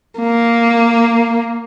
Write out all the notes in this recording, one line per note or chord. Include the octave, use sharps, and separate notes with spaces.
A#3